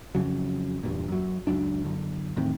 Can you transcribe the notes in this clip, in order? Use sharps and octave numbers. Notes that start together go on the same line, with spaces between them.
F2 C#3 F#3
E2 G2 A#2
F#2 F#3
C#2 F#2 F#3 D4
F#2 D3
E2 A2 D#3 C4